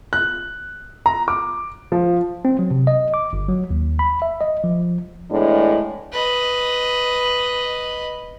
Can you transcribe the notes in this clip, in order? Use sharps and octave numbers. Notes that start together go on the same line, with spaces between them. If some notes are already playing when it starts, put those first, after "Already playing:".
F#6
A#5
D6
F3
C4
F#3
C3
D#5
D6
G1
F#3
D#2
B5
E5
D#5
F3
E2 A2 G#3 D4
B4 D#5